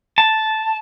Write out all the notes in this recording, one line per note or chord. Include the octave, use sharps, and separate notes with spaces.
A5